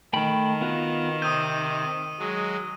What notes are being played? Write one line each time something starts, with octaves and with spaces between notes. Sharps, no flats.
D#3 A3 G5 B5
B3 F4 F#4
C3 D#6 E6 G6 D#7
F#3 G#3